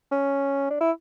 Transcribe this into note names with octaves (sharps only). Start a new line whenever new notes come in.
C#4
D4
E4